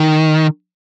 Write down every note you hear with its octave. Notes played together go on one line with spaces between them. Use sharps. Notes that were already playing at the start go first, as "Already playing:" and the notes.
Already playing: D#3